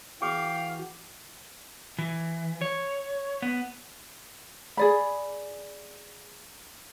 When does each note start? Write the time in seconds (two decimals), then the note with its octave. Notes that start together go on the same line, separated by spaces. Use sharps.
0.22 E3 F#4 G#4 F5 G5 D6
1.99 E3
2.61 C#5
3.42 B3
4.77 G#4 D5 B5